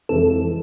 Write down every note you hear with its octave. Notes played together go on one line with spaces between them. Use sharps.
F2 C3 E3 G#3 A4